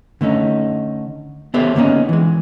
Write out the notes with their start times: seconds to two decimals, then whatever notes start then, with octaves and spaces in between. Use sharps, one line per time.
0.21 D3 A3 C#4 D#4
1.54 B3 G4 A4 C5 C#5 E5
1.75 D3 A#3 B3 C#4 D#4
2.09 E3 G#3